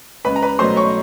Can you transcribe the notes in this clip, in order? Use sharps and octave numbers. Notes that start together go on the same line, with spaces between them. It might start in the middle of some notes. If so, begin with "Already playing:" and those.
C#2 B4 B5
A#5
B4 B5
B2 F#3 A3 C5 C6
C#5 C#6